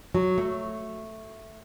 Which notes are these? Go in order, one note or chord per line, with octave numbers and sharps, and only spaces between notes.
F#3
A3